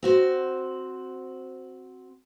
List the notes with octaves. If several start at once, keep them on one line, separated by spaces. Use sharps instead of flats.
C4 F#4 C5